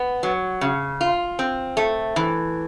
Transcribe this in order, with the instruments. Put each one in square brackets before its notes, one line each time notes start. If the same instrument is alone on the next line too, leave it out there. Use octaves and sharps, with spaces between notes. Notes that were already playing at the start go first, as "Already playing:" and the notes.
Already playing: [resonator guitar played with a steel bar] B3
F#3
C#3
F4
C4
A3
E3